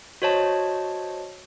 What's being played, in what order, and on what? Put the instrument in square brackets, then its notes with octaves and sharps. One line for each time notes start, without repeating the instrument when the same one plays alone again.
[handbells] F#4 C5 C#5 D#5 A5